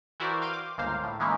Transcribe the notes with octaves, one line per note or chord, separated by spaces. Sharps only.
E3 E4 F#4 A#4 C5 D5
F5 G5 C6 D7 D#7
D6
G1 C#2 A#3 C5 F5
A2
E3 G#3 A#3 C#4 D#4 E4